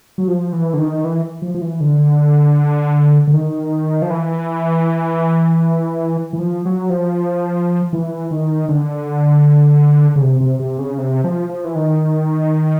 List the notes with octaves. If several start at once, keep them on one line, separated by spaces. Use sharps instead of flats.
F#3
F3
E3
D3
D#3
E3
F3
F3
E3
D3
D3
D#3
F3
E3
E3
F3
F#3
F3
E3
D#3
D3
C#3
C3
C3
C3
C#3
C3
F3
F3
E3
D#3